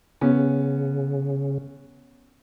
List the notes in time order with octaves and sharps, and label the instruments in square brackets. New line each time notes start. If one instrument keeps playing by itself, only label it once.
[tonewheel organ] C#3 [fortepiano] B3 C#4